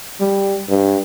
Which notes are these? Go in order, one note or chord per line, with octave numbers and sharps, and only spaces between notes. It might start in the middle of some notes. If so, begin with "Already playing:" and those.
G3
G2